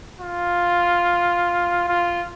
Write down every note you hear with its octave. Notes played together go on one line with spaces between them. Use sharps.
F4
F4